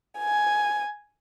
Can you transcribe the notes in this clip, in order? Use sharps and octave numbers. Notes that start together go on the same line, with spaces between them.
G#5